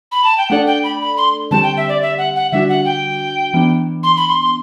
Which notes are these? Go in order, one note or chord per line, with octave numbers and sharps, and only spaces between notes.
B5
A5
G5
A3 D4 A4 D5 F#5
G5
B5
B5
C6
D3 G3 C4 G4 A5
G5
E5
D5
E5
F#5
F#5
D3 G3 D4 F#4 E5
F#5
G5
E3 B3 D4
C6
B5
C6
C6